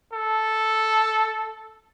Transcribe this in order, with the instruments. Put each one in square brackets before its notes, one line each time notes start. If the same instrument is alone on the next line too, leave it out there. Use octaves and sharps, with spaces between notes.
[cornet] A4